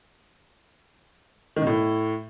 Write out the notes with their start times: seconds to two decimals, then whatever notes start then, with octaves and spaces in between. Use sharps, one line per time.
1.56 D#3
1.62 B2
1.67 A2